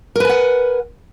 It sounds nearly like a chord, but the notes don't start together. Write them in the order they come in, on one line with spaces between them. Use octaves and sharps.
A#4 B4 G#5 F#5